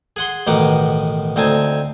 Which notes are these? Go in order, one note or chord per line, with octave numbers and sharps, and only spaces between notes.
G#4 F#5 C6
A1 B2 D#3 D#4 F#5 D6
D2 C4 D#4 G#5 A5